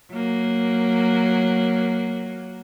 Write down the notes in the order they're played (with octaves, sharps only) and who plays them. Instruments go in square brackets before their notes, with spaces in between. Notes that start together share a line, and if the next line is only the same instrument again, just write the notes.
[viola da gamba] F#3 A#3